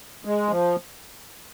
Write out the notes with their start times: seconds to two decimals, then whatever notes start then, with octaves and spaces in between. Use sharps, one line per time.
0.25 G#3
0.49 F3